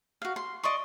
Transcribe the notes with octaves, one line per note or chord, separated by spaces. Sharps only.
F#4 F5
C6
D5 D#5 C6 C#6